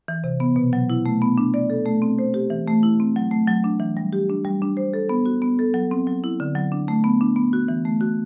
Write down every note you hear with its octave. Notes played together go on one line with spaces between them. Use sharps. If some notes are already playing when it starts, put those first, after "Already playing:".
E3
C3
B3
B2
F#3
E4
A3
B3
D4
D5
A4
A3
C4
C5
G4
E3
A3
E4
C4
F#3
A3
F#3
D4
E3
G3
G4
D4
G3
D4
C5
A4
B3
F#4
B3
A4
F#3
C4
F#3
E4
D3
F#3
D4
A3
B3
D4
B3
F#4
E3
A3
F#4